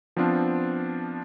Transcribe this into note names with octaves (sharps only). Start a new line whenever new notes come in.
F3 B3 C4 D4 F4